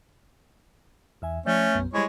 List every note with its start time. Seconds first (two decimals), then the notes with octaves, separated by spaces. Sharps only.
1.22 E2 E5 G#5
1.46 F3 A3 C#4 D5
1.73 B1 F#2 B3
1.93 G3 G#3 E4 C5 C#5 C#6